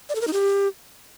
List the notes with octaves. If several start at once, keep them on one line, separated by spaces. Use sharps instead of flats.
D5
A4
A#4
D#4
G4